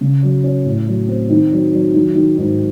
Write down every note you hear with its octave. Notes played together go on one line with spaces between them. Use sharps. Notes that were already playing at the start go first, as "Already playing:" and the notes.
C#3
F#3
C#4
A2
F#3
C4
D#3
F#3
F#3
D#3
D#3
G#2